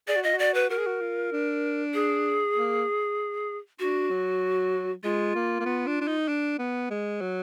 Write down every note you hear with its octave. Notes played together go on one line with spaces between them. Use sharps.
G#4 D5
F#4
F4 D#5
F#4
D5
B4
F#4 A#4
G#4
F#4
F4
D4
G#4
A#3
D4 F#4
F#3
G#3 F4
A#3
A#3
B3
D4
D4
D#4
D4
B3
G#3
F#3